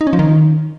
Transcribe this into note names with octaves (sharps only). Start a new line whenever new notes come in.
D#4
C#4
F3
D#3